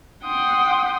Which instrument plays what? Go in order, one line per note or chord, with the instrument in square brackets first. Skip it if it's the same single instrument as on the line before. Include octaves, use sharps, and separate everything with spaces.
[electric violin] F#5 D#6 [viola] G5 C6